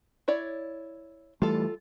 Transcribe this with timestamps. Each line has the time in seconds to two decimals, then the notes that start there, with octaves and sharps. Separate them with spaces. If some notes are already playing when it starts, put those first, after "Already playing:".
0.28 E4 C#5 D5
1.42 E3 G3 A3 F4 A4